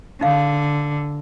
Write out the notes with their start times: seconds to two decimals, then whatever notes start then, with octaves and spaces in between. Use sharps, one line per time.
0.21 D3 D#4 F5